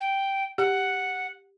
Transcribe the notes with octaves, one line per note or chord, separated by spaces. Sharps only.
G5
G4 F#5